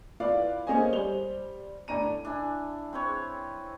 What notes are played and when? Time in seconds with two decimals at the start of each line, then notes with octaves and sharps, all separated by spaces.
0.20 E4 F4 B4 D5 F5
0.67 A#3 C#4 G#4 C5 D#5 G#5
0.93 G3 C5 F7 G7
1.88 A2 D4 A#5 D#7
2.25 D4 E4 G#5
2.93 C4 B4 C#5